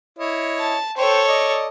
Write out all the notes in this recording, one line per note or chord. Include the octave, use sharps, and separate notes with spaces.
E4 C#5 D#5
A5
A4 C5 C#5 G5
D5 D#5